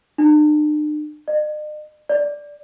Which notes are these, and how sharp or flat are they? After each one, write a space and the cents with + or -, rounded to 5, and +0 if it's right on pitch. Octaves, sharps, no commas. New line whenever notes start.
D4 +45
D#5 -45
D5 -5